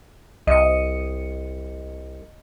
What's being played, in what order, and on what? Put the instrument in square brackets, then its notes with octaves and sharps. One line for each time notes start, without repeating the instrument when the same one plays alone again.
[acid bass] C2 [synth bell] D#5 C#7